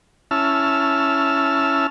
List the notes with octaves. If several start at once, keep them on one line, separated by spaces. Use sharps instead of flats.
C#4 E4 A5 E6 F6